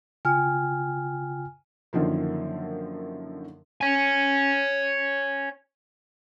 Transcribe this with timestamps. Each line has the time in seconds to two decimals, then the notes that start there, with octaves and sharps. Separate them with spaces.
0.25 C#3 F4 G5 G#5 F6
1.93 F#2 D3 D#3 F3 A#3
3.81 C#5 G#5